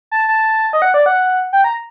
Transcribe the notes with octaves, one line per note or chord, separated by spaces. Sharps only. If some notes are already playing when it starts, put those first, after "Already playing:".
A5
A5
D#5
F#5
D5
F#5
G5
A#5